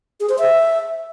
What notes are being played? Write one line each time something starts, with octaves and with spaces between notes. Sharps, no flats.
G#4
C5
E5